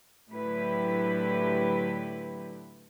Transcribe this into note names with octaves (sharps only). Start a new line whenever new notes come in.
A2 D3 F#3 E4 G4 B4